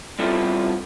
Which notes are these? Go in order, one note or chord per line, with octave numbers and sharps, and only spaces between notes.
G3 B3 C4 E4 F4 A4